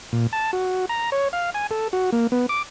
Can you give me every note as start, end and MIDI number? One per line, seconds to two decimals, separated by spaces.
0.13 0.27 46
0.33 0.51 81
0.53 0.85 66
0.89 1.10 82
1.12 1.28 73
1.33 1.50 77
1.54 1.67 80
1.71 1.88 69
1.93 2.10 66
2.12 2.27 58
2.32 2.46 59
2.49 2.63 86